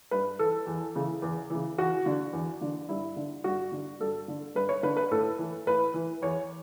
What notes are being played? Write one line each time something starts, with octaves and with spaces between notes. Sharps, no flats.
G2 B4
E3 A4
E2
C#3 E3
E2
C#3 E3
E2 F#4
D3
E2
D3
G2 E4
D3
G2 F#4
D3
G2 A4
D3
G2 B4
C#5
D3 B4
B4
A2 A4
E3
A2 B4
E3
E2 C#5